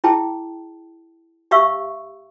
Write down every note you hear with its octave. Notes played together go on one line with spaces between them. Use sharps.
E4 G#4 G5 A5
G4 E5 F5 C#6 E6